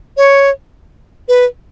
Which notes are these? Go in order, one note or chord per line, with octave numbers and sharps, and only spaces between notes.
C#5
B4